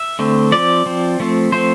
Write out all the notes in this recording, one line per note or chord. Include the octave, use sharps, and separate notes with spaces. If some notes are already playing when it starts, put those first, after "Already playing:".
Already playing: E5
D3 A3 C4
F3 C4 D5
F3 C4
F3 A3 C4
F3 A3 C4 C5